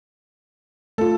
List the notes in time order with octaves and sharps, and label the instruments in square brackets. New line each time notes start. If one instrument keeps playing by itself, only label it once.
[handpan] A3 F4 [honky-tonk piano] A4